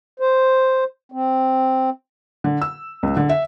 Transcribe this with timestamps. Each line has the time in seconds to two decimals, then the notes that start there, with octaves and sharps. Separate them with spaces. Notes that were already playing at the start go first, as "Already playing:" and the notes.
0.20 C5
1.12 C4
2.44 D3
2.62 E6
3.03 C#2
3.17 D3
3.29 E5